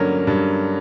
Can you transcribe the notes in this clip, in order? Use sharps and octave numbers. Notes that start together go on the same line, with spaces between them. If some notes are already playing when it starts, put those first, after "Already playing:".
Already playing: G2 D3 F#3 A#3 C#4
G2